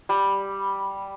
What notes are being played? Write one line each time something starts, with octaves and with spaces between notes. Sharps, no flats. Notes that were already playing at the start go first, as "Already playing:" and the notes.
G3